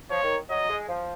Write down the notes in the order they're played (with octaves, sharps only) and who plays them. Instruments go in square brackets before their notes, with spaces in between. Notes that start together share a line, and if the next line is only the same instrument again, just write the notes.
[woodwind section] F3 [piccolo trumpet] C#5
[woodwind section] D#3
[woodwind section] F#3 [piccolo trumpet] D#5
[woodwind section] G#3
F3